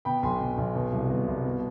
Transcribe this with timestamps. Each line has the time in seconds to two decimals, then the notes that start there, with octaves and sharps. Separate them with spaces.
0.05 B2 G5 B5
0.23 B1 G#5 C6
0.40 B2
0.58 B1
0.75 B2
0.93 C2
1.10 B2
1.28 C2
1.45 B2